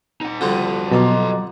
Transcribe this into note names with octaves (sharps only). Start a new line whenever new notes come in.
D#4 F#5
F2 D3 G3 F#4 A4
B2 F#3 A4 D#5 A#5 D6